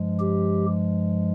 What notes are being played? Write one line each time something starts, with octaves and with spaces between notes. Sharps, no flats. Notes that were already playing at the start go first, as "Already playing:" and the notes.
Already playing: G2 F3 G#3
G4